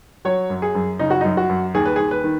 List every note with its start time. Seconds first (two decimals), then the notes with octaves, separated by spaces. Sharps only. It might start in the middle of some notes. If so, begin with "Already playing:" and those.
0.25 F#3 C#5
0.50 F#2
0.62 G#4
0.75 F#2
0.99 C#3 D#4
1.10 F#4
1.21 F#2 D#4
1.37 F#4
1.49 F#2
1.74 D#2 G#4
1.85 B4
1.96 D#2 G#4
2.11 B4
2.24 D#3